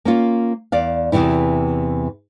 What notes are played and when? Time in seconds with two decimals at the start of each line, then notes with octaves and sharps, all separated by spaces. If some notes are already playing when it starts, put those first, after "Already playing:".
0.05 A#3 C#4 F4
0.72 E2 D5 F5
1.12 E2 G2 C3 E3 E4